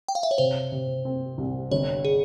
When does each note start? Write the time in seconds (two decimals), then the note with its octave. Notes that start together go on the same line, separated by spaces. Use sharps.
0.08 G5
0.15 F5
0.23 E5
0.31 C#5
0.38 C3 C5
0.72 C3
1.05 C4
1.38 C2
1.71 G1 C#5
2.05 G#4